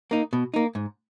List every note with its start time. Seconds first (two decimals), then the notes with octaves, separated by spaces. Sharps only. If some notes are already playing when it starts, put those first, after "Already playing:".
0.11 A#3 D#4
0.33 B2
0.54 A#3 D#4
0.75 G#2